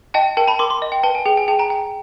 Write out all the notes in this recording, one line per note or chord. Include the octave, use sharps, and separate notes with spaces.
D#5 G5 A5
A#4 G5 A5
A5 B5
A#4 C6 D6
C6 D6
D#5
G5
B4 G5 A5
G#5
G#4 G5
G#5
G#4 G5 A5
G#5 A#5
G5